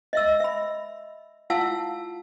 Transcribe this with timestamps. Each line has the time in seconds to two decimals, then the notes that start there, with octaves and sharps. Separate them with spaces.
0.13 D#5 E5 E6
0.40 E5 B5
1.50 E4 F4 F5 F#5 A5 E6